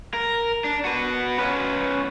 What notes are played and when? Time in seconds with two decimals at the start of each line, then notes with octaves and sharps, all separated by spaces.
0.14 A#4
0.64 D4
0.85 F#4 B4
1.38 C#4 B4